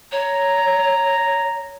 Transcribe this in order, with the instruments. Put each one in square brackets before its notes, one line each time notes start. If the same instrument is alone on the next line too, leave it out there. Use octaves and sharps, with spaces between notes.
[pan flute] C#5 [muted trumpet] A#5